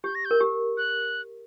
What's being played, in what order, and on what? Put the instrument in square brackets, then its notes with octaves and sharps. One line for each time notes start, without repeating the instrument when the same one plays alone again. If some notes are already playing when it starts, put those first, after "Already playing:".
[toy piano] G4 [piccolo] G6
[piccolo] A#6
G6
[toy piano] A#4
G4
[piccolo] F#6